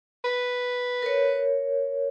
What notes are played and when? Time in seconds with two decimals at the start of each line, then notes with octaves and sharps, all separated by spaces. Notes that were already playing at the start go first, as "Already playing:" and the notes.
0.24 B4
1.02 A#4 C#5